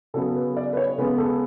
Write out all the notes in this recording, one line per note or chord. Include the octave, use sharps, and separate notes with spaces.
C#3 F#3 B3 A4
B4
D5
B4
C#5
C#3 G#3 B3 B4
A4